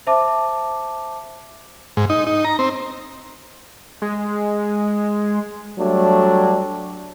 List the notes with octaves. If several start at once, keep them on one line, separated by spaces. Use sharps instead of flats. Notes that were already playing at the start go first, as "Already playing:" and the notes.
C5 E5 A5 D6
G#2
D#4
D#4
A#5
C4
G#3
F#3 G3 A3 D4